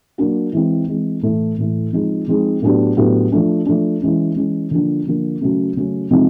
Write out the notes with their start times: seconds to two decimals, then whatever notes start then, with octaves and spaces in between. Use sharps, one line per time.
0.18 F#3 A#3 D4 F#4
0.53 E3 G#3 C4
0.88 E3 G#3 C4
1.22 A2 E3 A3
1.58 A2 E3 A3
1.93 F3 G#3 C4 D#4 G#4
2.28 F3 G#3 C4 D#4 G#4
2.62 A2 F#3 B3 D4 G4
2.97 A2 F#3 B3 D4 G4
3.32 F3 A3 D4
3.66 F3 A3 D4
4.02 E3 G#3 C#4
4.36 E3 G#3 C#4
4.71 D3 F3 A#3 D4
5.06 D3 F3 A#3 D4
5.41 C#3 F#3 A3 C#4
5.76 C#3 F#3 A3 C#4
6.11 C3 F3 G#3 C4 D#4